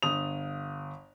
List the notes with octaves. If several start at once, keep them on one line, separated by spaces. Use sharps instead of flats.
G1 D#6 F7